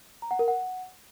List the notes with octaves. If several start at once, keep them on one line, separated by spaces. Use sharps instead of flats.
A#5
F#5
A#4
F#5